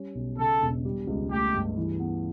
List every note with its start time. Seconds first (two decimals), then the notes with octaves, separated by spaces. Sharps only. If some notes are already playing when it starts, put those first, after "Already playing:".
Already playing: G3 C#4
0.15 B1
0.38 C#3 A4
0.62 E1
0.85 G3
1.07 C#2
1.31 A3 G4
1.54 G2
1.77 E3
1.99 B3